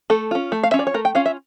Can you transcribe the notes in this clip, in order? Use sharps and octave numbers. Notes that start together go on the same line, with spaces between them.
A3 A4
C#4 F4
A3
F5
C#4 F4 E5
D5
C#5
A3 A#4
G5
C#4 F4 F5
E5